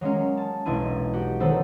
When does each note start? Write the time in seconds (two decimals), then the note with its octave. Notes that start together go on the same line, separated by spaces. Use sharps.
0.01 F#3 G#3 A#3 C#4
0.37 A5
0.65 E1 B1 G#3 D4 E4 D#7
1.13 F#4 G4
1.40 D#3 F#3 B3 A4 B4 C5